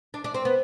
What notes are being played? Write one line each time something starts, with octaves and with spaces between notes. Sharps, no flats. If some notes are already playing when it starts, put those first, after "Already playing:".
D4
D4
C4
B3